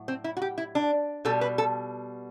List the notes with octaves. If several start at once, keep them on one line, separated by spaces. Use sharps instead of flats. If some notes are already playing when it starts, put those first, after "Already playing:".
Already playing: A2 F#3
C4
E4
F#4
G4
E4
D4
B2 G3 A4
B4
A4